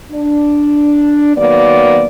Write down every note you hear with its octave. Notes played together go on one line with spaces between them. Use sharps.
D4
D#3 F#3 A#3 B3 D5